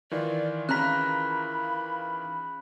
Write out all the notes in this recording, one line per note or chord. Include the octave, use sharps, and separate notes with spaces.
D#3 E3 F4 D5
C#3 A#5 B5 F#6 B6